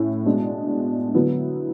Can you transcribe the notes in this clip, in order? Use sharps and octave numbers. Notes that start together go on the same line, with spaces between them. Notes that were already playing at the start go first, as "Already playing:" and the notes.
Already playing: A2 C#4 E4
B2 G#3 D4
D3 F#3 B3 E4